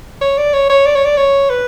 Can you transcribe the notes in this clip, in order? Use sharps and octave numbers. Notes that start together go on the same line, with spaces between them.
C#5
D5
C#5
C#5
D5
C#5
D5
C#5
B4